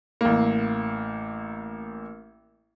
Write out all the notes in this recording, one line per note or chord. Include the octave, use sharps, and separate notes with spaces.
A1 A#3